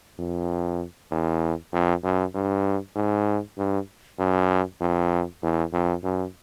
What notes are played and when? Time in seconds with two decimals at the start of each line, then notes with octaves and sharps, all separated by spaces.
0.19 F2
1.11 E2
1.73 F2
2.04 F#2
2.34 G2
2.96 G#2
3.58 G2
4.19 F#2
4.81 F2
5.43 E2
5.73 F2
6.04 F#2